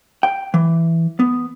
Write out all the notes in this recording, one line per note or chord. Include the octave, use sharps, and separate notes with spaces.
G5
E3
B3